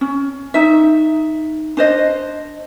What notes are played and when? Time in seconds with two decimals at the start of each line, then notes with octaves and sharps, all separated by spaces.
0.01 C#4
0.54 D#4 E5
1.77 D4 C5 D#5